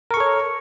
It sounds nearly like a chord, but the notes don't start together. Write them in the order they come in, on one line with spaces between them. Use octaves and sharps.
A#4 C#6 A4 C#5